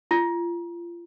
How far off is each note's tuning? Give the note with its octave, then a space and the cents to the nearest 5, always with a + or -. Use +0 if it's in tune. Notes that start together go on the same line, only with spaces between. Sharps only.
F4 -30